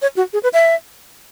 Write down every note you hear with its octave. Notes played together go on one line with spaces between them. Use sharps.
C#5
F#4
G#4
B4
E5